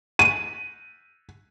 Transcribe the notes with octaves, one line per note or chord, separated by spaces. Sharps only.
D#7